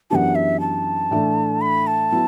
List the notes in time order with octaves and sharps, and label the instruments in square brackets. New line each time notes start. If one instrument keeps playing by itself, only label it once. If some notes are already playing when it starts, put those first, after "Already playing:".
[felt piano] F#2 E3 B3 D4 G4 [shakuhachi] F#5 A5
[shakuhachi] E5
A5
[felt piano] A2 E3 A3 D4
[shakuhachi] B5
A5
[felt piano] F#3 B3 E4